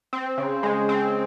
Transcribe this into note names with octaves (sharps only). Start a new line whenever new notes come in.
C4
C#3
G#3
C4